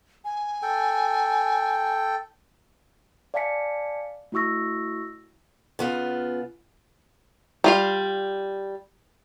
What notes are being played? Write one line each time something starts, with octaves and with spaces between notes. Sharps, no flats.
G#5
A4 G5
D5 F5 G#5 A5 B6 C#7
A3 E4 F#4 C#6 E6 A#6
C#3 B3 F4
G3 F4 F5